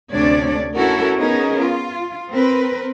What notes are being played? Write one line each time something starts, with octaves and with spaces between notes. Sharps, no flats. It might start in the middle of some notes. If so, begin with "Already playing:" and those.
D2 C3 C#4 D4 C#5 D5
C#4 E4 F#4 A4 A#4
B3 C#4 D#4 G#4 A#4
F4
C4 A#4 B4